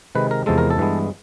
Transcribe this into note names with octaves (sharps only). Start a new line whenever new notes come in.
C3 D#3 G#3 B4
A#4
E2 C3 F3 G#3 A4
A#4
A4
G2 E3 G#3 B3